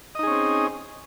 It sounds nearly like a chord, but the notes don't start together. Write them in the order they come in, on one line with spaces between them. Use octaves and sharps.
D#5 D#4 G#4 C#4 C4